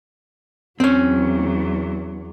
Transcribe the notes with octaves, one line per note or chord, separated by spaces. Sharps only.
E2 F#3 C4 C#4